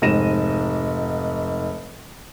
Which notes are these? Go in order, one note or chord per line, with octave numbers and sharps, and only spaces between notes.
F1 G#2 A#6 D#7 E7